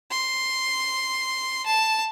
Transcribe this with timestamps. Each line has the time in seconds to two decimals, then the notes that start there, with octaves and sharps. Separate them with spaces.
0.11 C6
1.66 A5